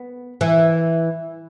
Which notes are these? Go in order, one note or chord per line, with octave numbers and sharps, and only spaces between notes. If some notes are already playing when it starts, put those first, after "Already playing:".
Already playing: B3
E3